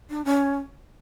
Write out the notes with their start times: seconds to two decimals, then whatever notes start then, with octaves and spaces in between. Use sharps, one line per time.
0.10 D4
0.25 C#4